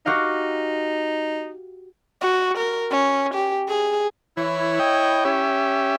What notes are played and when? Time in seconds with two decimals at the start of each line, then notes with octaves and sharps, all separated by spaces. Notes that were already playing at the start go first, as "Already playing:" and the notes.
0.06 D#4 F#4 G4 F5
2.22 F#4
2.58 A#4
2.91 C#4
3.34 G4
3.68 G#4
4.37 E3 E4 C#5
4.79 D#5 G5
5.25 C#4 G4 E5